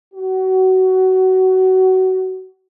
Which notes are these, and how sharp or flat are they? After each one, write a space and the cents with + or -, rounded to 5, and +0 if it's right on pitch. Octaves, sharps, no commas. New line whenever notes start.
F#4 +20